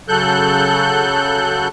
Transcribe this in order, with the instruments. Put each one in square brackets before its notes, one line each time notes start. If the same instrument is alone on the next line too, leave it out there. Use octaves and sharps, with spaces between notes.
[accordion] C#3 F#3 A4 F#6 G6